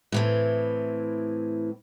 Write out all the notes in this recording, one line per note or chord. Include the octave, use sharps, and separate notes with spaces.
A2 E3 C4